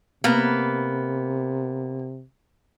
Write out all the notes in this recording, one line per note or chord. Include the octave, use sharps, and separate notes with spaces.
C3 A#3 B3